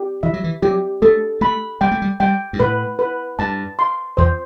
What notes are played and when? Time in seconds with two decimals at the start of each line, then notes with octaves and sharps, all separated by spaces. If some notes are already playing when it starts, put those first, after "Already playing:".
Already playing: G4
0.23 E3 E5
0.34 F#3
0.44 E3
0.62 F#3 G4
1.02 A3 A4
1.41 A3 B5
1.81 G3 G5
1.91 A3
2.02 G3
2.20 G3 G5
2.53 G2
2.60 A2 B4
2.99 B4
3.39 G2 A5
3.79 C6
4.17 E2 C5